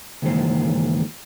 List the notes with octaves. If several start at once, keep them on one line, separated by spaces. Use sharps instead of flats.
C#2 G2 D#3 E3 A#3 C5